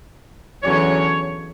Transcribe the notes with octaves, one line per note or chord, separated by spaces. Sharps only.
E2 D3 F#3 C#4 C#5